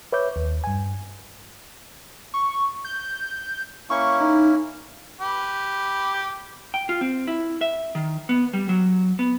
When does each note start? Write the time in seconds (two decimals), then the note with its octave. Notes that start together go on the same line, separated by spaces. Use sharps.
0.12 B4 C#5 E5 D6 G6
0.36 D#2
0.64 G2 G#5
2.34 C#6
2.85 G6
3.90 A#3 C#4 E4 C#6
4.21 D#4
5.21 G4 B4
6.74 G5
6.89 F4
7.01 C4
7.27 E4
7.61 E5
7.95 D#3
8.29 B3
8.53 G3
8.69 F#3
9.19 B3